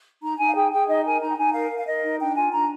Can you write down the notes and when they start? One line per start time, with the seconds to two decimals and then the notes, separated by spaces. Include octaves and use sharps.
0.23 D#4 A#5
0.39 D#4 G#5
0.48 F5
0.55 G#4 G5
0.72 G#4 G5
0.88 D#4 D#5
1.04 A#4 G#5
1.21 D#4 A#5
1.29 G5
1.37 D#4 G#5
1.54 A#4 F5
1.70 A#4
1.78 F5
1.86 A#4 D#5
2.03 D#4
2.19 D4 G5
2.35 F4 G#5
2.52 D4 A#5